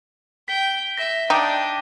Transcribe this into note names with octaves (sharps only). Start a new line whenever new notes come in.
G5 B6 G7
E5 A#6
D4 D#4 G5 D6 D#7